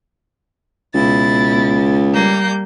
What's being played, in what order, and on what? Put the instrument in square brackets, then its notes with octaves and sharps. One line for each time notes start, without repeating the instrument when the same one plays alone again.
[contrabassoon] C#2 [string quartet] B2 E4 A6
[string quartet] G3 A#3 G6